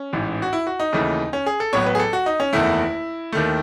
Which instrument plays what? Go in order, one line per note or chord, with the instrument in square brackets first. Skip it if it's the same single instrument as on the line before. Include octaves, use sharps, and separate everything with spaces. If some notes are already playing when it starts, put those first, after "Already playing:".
Already playing: [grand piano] C#4
A1 G#2 E3
F#4
E4
F#4
D#4
D#2 C#3 E3 A3
C#4
G#4
A4
A1 A2 F#3 B3 C#5
B4
G#4
A4
F#4
D#4
C#4
F#1 E2 D#3 A3 E4
D#2 D#3 A3